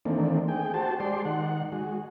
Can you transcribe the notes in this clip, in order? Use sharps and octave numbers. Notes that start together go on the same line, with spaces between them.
D#3 E3 A3 A#3 C4 D4
G#4 G5
F#4 G4 C5 A5
G#3 G4 D5 C6
D#3 F#5
G#3 F#4